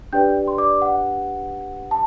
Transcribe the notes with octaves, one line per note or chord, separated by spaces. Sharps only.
D4 G4 B4 D5 G5 G6
C6
D5 D6
F#5
A5